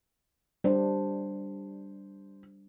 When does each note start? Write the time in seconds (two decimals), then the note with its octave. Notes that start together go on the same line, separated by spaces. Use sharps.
0.64 G3 D4 C5